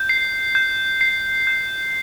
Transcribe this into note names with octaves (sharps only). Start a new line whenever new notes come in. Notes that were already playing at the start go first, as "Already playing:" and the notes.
Already playing: G6
C7
G6
C7
G6